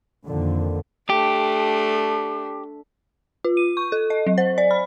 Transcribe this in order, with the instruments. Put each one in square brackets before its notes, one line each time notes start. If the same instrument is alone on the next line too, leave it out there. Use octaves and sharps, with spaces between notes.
[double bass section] F2 A#2 D3 D#3
[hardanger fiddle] A3 D4 [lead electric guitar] G4
[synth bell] F4
D#7
C#6
A4
D#5
F#3
C5
D5
B5